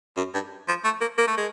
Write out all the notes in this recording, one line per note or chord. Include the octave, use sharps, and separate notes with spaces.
F#2
G2
F3
A3
A#3
A#3
A3
G#3